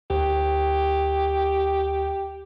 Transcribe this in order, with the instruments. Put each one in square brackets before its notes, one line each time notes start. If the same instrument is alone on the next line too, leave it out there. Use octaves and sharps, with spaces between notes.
[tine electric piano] D2 [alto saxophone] G4